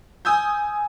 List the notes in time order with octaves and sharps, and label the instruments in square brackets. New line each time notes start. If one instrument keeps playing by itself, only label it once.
[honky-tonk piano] G#5 D#6 E6 G6